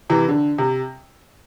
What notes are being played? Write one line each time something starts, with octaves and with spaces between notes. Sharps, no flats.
C3 E3
D3
C3